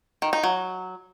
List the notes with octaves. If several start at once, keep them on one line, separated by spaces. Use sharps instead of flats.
D#3
D#4
F#3